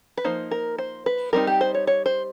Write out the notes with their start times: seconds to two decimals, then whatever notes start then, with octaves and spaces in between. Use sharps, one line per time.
0.17 B4
0.24 F3 A#3 D#4 C5
0.51 A#4
0.78 C5
1.06 B4
1.33 G3 C4 D#4 A#4
1.47 G4
1.61 C5
1.75 C#5
1.87 C#5
2.06 C5